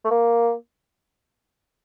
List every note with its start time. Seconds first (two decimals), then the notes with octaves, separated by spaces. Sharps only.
0.05 A3
0.11 A#3